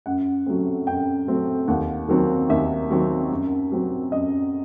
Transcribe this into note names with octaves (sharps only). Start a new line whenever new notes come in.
F#2 F#5
F#3 A3 C4
F#2 G5
F#3 A3 C4
D#2 F#5
D#3 F#3 C4
D#2 E5
D#3 F#3 C4
F#2
F#3 C4
F#2 D#5